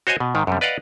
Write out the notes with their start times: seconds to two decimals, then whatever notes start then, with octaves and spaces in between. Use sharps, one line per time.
0.07 F#4 C5 C#5 D#5 G#5
0.20 B2
0.35 G#2 D#3
0.47 F#2 C3 G3
0.61 B4 D5 D#5 F5 F#5